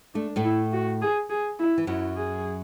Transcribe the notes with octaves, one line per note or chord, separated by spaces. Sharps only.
A3 D4
A2 A3
E4
F#4
G#4
G#4
E4
E3
F#2 F#3 E4
G#4